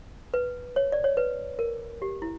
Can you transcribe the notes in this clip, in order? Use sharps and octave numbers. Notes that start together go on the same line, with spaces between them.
B4
C#5
D5
C#5
B4
A#4
G4
E4